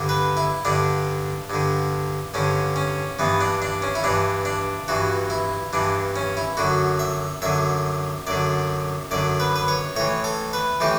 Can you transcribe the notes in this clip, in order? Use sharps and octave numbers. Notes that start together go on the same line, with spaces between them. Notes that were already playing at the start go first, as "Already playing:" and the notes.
Already playing: G2 D3
B4
E4
G2 D3 D4
G2 D3
G2 D3 C#4
C#4
G2 E3 B3
D4
D4
C#4
E4
G2 E3 D4
D4
G2 E3 F#4
E4
G2 E3 D4
C#4
E4
F#2 D3 F#4
E5
F#2 D3 E5
F#2 D3 D5
F#2 D3 D5
B4
B4
C#5
A2 E3 C#5
A4
B4
A2 E3 G4